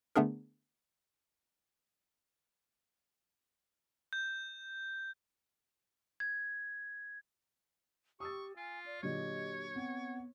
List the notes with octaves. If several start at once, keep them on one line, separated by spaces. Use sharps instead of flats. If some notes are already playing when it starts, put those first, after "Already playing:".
D3 A3 B3 D4 G#4 A#4
G6
G#6
G4 C#6 D#6 E6 A6
F4 G#5
D5
A#2 D3 F#3 G4 C#5 D#5
B3 C4 F#5